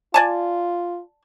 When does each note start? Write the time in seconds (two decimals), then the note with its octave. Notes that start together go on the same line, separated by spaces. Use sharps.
0.14 F4 D5 G#5 A5